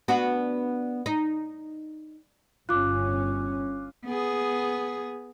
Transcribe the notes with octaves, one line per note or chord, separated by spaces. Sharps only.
B3 D4 F#4
D#4
G1 C#4 F4 D6 F#6
B3 G#4